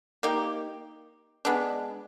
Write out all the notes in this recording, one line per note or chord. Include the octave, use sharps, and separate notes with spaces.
A#3 D#4 G4
G#3 B3 D4